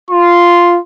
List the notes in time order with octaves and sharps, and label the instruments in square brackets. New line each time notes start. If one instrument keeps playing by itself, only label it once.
[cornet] F4 [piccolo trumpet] C6